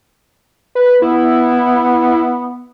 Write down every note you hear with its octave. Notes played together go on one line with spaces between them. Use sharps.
B4
B3 E4